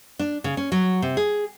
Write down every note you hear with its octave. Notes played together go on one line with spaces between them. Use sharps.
D4
C#3
C#4
F#3
C3
G#4